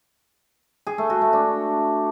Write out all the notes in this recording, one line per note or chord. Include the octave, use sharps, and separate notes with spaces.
G#4
A3
F#4
A3
D4